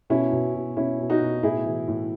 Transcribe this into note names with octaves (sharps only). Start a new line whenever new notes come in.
B2 C#4 E4
B2
B2
B2 C#4 E4
B2
D#4 F#4
B2
A2 E4 G#4
E3
A2